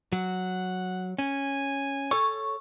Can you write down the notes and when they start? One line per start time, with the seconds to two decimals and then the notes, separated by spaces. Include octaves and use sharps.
0.12 F#3 F#5
1.19 C#4 G#5
2.11 A4 C#5 C#6